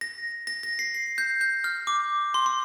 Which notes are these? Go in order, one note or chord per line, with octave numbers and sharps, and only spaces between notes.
A#6
A#6
A#6
C7
C7
G6
G6
F6
D6
C6
C6